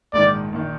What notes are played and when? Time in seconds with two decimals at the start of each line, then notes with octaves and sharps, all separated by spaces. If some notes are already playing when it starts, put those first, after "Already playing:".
0.13 A#1 G#2 D#3 D5
0.52 A#1 D#3